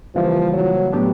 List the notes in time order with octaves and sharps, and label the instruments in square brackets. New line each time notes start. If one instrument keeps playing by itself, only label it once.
[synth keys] C#3 E3 G3 A#3 [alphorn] F3
[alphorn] F#3
[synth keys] A2 F#3 B3 D4 G4